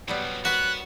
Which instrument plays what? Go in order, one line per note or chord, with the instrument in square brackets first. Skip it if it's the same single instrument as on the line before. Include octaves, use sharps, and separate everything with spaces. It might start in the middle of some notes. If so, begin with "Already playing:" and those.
[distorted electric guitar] C2 B2 [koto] F#3 G3 B3
[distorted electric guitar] B3 [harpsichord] F#4 [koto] A#4 B4 [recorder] F#6